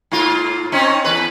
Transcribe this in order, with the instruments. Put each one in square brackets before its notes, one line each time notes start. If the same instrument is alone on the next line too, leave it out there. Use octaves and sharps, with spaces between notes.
[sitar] G#2 A#3 F4
C4 C#4 D#4
E2 B4